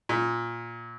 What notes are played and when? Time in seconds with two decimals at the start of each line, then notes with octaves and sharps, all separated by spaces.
0.09 A#2